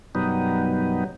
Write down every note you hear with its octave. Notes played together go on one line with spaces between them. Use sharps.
F#2 B2 F#3 G3 B3 D#4